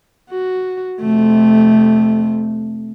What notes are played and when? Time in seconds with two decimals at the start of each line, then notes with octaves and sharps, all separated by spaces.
0.30 F#4
1.00 F2 C3 A3